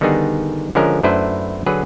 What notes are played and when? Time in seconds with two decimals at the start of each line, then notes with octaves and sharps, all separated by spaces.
0.01 D3 D#3 G3 B3 D#4 G#4
0.75 D3 F3 G#3 C#4 A#4
1.03 F#2 A3 D4 E4 B4 C5
1.66 D3 F#3 G#4 B4